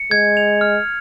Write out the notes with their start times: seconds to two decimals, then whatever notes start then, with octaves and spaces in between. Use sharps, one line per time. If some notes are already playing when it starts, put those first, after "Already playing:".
Already playing: C#7
0.11 G#3 G#6
0.37 F7
0.61 F6